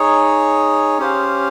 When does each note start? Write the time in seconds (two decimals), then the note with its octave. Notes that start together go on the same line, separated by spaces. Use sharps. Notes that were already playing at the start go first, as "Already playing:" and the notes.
Already playing: D#4 G#4 C#5
0.98 C#4 G4 C5 F5